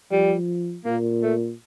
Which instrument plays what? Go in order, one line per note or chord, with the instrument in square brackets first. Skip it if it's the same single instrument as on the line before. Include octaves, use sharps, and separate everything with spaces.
[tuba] F3 [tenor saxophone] G3
[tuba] A#2 [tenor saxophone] A#3
[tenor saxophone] A3